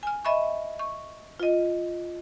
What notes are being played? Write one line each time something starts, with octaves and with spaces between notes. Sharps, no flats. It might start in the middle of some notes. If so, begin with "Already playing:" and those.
G#5 F6
D#5 E5 B5 C#6
C#6
F4 D#5